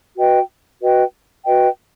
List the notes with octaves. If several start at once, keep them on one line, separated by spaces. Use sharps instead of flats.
F#4 B4 D#5 G5
F#4 B4 D#5 G5
F#4 B4 D#5 G5